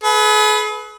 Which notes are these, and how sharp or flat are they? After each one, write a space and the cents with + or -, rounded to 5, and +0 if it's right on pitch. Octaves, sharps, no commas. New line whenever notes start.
G#4 +45 B4 +0